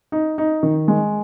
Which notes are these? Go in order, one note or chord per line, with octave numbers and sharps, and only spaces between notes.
D#4
D#4
D#3
G#3